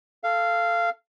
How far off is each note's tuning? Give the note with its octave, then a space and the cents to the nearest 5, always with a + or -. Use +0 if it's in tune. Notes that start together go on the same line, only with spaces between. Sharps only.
A4 +0 F5 -15